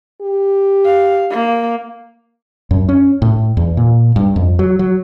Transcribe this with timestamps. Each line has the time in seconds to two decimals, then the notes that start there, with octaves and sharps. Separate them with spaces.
0.22 G4
0.85 F5
1.30 A#3
2.71 F#2
2.89 C#4
3.22 A2
3.57 E2
3.77 A#2
4.16 G2
4.36 F2
4.59 F#3
4.79 F#3